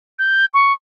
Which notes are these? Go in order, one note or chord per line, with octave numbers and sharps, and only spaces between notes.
G6
C#6